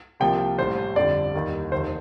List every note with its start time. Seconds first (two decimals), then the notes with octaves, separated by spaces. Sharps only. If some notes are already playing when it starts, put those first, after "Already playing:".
0.20 C2 C3 F3 A#3 G5
0.58 A1 A2 G3 C5
0.96 G1 F2 D3 G3 D5
1.34 D#2 D#3 G3
1.72 F1 D#2 D#3 C5